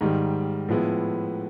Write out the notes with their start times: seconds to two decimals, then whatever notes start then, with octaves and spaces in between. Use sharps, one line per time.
0.01 G#2 D#3 G3
0.69 A2 F3 G#3 B3 E4